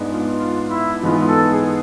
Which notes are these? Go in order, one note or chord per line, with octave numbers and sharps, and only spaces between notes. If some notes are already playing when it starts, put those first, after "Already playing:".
Already playing: G#2 G#3 B3 D4
F4
F4
E4
G#2 E3 G#3 B3 F4
A4
G#4